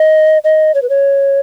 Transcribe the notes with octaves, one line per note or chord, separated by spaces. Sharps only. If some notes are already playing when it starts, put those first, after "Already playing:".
Already playing: D#5
D#5
C#5
B4
C#5